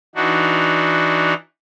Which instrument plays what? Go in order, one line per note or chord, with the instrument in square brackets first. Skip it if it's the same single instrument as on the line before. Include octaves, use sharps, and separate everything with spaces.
[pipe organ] E3 D4 D#4 F#4